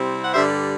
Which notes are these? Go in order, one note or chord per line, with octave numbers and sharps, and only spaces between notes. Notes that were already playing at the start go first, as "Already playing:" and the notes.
Already playing: C3 G3 C4 E4
F#5
G2 D3 G3 C5 E5